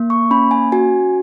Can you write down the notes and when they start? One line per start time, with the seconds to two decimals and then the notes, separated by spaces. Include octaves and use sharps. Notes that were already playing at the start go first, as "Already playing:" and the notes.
Already playing: A#3
0.10 C#6
0.31 C#4 B5
0.51 G#5
0.72 F#4 G#5